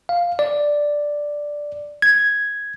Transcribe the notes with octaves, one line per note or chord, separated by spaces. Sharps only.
F5
D5
G#6